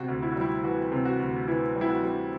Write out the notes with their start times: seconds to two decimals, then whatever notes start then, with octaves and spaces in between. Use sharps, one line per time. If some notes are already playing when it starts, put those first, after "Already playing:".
Already playing: C3 F#4
0.09 D2
0.22 E4
0.32 F#4
0.36 G3 E4
0.64 E3 F#4
0.92 C3
1.05 F#4
1.20 D2
1.47 E3 E4
1.76 G3
1.81 E4
1.89 F#4
2.03 G3